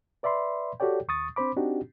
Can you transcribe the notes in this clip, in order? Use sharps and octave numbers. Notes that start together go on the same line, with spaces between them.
B4 D5 E5 B5 C6
F#4 G4 A4 C#5 D5 G5
D#2 C#6 D#6 A6
C4 D4 C5 B5 D6
C4 D4 D#4 F#4 G4